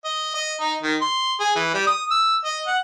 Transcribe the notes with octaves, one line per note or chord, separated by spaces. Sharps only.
D#5
D#5
D#4
D#3
C6
G#4
E3
G3
D#6
E6
D#5
F#5